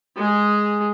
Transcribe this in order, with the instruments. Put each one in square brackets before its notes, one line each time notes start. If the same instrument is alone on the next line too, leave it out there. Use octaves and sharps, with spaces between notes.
[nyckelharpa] G#3 G#4